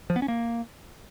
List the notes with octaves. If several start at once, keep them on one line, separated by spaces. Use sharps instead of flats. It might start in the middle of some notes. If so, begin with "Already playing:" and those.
F3
B3
C#4
A#3